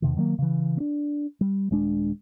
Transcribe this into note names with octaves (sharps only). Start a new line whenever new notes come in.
E2 C3 D#3
D#3 F#3 G3 A#3
C#3 E3
C4 D4
G3
D#1 G#3 D4